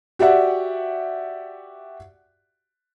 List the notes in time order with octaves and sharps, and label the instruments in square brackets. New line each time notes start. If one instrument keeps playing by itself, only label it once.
[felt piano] F#4 G4 D5 E5 F#5